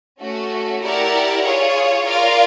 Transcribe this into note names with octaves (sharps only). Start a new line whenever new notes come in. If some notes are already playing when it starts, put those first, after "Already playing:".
A3 C#4 F#4
E4 G4 A#4 D5 F#5
F4 G#4 C#5
F4 A#4 D5 F5